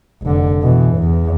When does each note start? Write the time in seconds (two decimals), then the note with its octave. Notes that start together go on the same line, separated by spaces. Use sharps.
0.23 F1 D3
0.62 B2 E3
0.96 E2